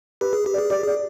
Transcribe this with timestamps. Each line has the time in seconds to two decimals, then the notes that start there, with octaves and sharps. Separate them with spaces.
0.21 G4 B4
0.33 G#4
0.46 G4
0.54 G#4 D5
0.70 G4 D5
0.83 G#4 D5